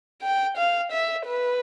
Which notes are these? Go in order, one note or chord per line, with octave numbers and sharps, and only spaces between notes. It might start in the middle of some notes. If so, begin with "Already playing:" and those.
G5
F5
E5
B4